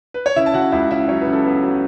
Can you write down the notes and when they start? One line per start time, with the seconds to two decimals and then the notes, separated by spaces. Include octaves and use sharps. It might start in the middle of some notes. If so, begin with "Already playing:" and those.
0.14 B4
0.26 C#5
0.36 C#3 E4 E5
0.46 A5
0.54 C#3 F#4 F#5
0.72 C#2 E4 E5
0.91 C#3 E4 E5
1.08 F#3 C#4 C#5
1.21 B4
1.26 C#3
1.33 A4
1.45 B3
1.62 F#3